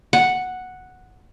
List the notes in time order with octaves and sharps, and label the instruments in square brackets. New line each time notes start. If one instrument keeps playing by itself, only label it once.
[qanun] F#5